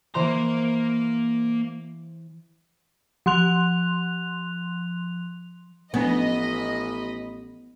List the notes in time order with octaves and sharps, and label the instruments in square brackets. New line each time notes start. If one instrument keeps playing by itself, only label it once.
[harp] E3 C5 C6 [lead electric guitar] A#3 A#5
[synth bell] F3 C6 F#6 F7
[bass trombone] A1 [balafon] F3 C#4 D4 [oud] B3 [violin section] D#5 B5